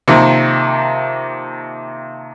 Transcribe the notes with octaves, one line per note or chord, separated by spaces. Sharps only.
C3 D#3 F3 A#3